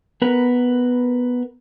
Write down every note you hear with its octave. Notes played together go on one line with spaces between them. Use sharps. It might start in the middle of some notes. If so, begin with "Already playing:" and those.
B3 A#4 B4 A#5